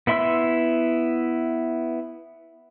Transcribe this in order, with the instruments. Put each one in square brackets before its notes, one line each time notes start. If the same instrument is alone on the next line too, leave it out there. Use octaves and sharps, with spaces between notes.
[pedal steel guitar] B3 E4 E5 C6 E6